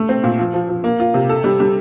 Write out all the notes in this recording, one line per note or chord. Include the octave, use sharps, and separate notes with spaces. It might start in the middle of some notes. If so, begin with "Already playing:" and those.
Already playing: A3
C4
A#2
F3
F3
F3
A#3
F4
C3
A4
G3
G3